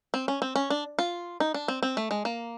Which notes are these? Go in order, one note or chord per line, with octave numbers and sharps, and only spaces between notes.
C4
C#4
C4
C#4
D4
F4
D#4
D4
C4
C4
A3
G#3
A#3